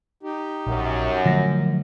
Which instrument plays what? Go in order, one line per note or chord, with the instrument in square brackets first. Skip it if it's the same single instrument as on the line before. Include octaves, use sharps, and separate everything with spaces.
[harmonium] D#4 G4
[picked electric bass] A#1 [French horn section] F#2
[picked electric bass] D3 F#3 A3 [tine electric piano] F3 A#6